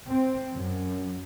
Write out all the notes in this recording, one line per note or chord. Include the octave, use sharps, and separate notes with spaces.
C4
F#2